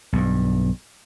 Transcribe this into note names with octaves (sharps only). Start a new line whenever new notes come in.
B1 G2